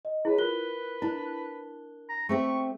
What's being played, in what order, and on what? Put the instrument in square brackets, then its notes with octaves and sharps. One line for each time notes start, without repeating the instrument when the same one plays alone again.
[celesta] D#5
[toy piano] E4 [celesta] G#4 C#5 [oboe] B4
[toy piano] F4 [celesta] A#4 F#6 G7
[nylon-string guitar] D4 [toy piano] E4
[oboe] A#5
[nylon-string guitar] A3 C4 G4 [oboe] C#6